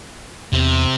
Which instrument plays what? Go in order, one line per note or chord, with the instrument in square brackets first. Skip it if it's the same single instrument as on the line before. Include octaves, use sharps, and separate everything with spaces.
[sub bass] E2 [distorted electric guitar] C3